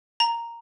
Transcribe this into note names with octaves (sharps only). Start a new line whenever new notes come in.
A#5